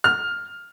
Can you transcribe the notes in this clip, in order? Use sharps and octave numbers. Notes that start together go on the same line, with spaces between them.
F6